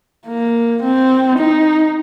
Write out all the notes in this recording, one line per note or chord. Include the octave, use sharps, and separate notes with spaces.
A#3
C4
D#4